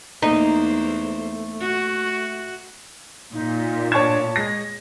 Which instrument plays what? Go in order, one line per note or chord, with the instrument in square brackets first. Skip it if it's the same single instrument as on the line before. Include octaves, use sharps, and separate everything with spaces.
[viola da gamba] E2 A#3 C5 [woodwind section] A3 [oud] D#4
[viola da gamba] F#4
[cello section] A#2 [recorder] D#4
[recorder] D4 [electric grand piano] C#5 E7 [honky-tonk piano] A5 C#6 G#6
[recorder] G#3 [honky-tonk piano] A#6